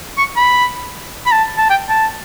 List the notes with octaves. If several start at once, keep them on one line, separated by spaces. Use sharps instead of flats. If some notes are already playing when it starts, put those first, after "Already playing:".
C#6
B5
B5
A5
A5
G5
A5